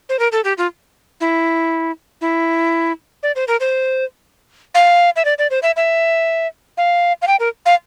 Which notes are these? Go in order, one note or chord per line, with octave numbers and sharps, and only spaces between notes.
C5
A#4
A4
G4
F4
E4
E4
D5
C5
A#4
C5
F5
E5
D5
D5
C5
E5
E5
F5
F5
G5
A#4
F5